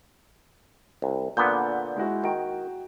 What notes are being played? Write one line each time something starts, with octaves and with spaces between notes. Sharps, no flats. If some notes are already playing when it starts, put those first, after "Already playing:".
C2
A#2 D3 B3 G6
G#3 E4 F#4
D#3 F#4 G5 D7